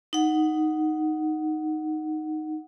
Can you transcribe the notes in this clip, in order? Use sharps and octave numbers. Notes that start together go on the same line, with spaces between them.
D#4 F#5